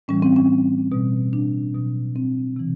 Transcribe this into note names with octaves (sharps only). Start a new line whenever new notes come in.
A2 E3 G3 C#4
C4
C#4
B2 G3
D4
B2 F#3
C4
C3 E3